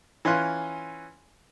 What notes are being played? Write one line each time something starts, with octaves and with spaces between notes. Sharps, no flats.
E3 C#4 F4 C6 F#6